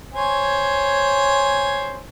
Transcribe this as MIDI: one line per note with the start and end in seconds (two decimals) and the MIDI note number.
0.14 2.01 72
0.14 2.01 73
0.14 2.01 80